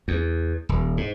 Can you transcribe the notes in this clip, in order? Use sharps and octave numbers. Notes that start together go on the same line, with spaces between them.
E2
D#1
G#2